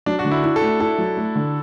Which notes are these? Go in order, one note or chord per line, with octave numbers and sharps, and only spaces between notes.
F#3 D4
F#4
D3
E4
E4
A4
A3
E4 A4
F#3
A3
D3